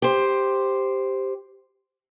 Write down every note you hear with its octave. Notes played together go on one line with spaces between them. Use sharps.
G4 C5